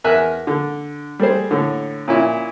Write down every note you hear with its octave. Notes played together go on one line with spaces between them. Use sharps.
E2 A#4 E5 G#5 F#6
D3
G3 A3 G#4 C5
A2 D3
A#2 C#4 E4